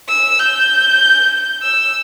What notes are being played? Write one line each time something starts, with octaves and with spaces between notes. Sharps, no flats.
E6
G6
E6